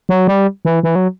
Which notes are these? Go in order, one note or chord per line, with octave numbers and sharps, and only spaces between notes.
F#3
G3
E3
E3
F#3